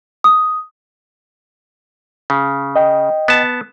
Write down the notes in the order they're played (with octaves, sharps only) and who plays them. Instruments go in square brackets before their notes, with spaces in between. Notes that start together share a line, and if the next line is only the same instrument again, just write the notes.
[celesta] D#6
[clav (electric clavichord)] C#3
[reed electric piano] D#5 G5
[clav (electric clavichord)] B3 A5